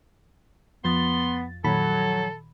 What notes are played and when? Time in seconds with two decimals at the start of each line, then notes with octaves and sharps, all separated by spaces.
0.84 F2 F3 B3 C6 A6
1.65 A#2 D#3 F#3 A4 B5